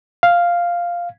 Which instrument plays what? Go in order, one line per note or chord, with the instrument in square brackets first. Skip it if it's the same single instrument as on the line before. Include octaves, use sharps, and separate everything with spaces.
[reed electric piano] F5